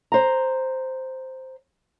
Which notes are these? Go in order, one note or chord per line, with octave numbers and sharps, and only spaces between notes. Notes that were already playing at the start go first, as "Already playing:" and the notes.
C5 A#5